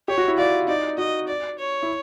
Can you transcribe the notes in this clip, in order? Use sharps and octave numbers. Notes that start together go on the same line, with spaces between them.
G4 C#5
F#4
E4
F4 D5
D#4 D5
F#4 D#5
D5
C#5
E4